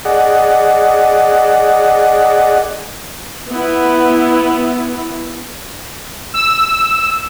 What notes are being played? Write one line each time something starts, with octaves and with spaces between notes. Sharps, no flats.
G#4 D5 D#5 F#5
B3 E4
E6